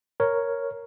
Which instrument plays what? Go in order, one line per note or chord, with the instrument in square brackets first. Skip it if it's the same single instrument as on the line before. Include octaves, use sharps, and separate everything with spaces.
[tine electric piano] A#4 C#5